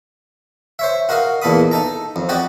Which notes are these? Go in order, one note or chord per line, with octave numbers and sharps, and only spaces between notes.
C5 C#5 E5
F#4 A#4 D#5 F5
E2 A#2 A4 D#5 B5 D#6
D#4 A4 A#5
F2
F#4 G4 D5 D#5